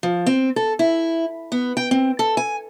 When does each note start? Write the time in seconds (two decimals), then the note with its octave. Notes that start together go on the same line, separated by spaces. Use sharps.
0.03 F3
0.26 C4
0.56 A4
0.79 E4
1.52 B3
1.77 G5
1.91 C4
2.19 A4
2.37 G#5